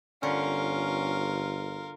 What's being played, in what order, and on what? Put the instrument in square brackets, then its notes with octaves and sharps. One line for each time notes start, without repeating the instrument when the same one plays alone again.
[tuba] G1 [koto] D3 [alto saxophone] C#4 [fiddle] F4 A#4